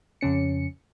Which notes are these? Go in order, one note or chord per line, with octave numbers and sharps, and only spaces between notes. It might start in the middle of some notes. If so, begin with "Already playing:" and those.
F2 C#3 C#4 C#7